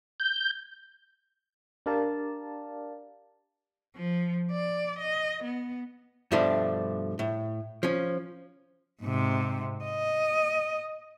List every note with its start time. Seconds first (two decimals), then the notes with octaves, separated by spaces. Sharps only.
0.20 G6
1.86 D4 G4 A#4 D5 F5 A5
3.96 F3
4.51 D5
4.99 D#5
5.44 B3
6.32 G2 B2 F3 G3 A3 D4
7.19 A2
7.83 F3 C#4
9.02 G#2 C3
9.85 D#5